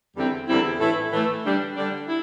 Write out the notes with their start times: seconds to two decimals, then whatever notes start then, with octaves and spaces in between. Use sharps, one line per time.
0.15 E2 D3 G3 C4 E4
0.48 E2 D3 G3 C4 E4
0.79 A2 E3 A3 E4
1.11 A2 E3 A3 E4
1.44 D3 G3 D4
1.76 D3 G3 D4
2.08 E4